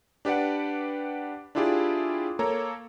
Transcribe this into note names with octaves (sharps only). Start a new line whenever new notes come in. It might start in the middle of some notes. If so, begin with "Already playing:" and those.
D4 G4 B4 D5 F#5
D4 E4 F4 G4 G#4 D5
A#3 A4 C#5 A#5